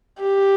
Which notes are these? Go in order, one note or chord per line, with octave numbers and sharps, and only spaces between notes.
G4